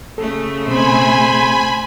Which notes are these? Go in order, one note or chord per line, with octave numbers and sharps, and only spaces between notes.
C#3 A3 A4
B2 C4 C5 G#5 B5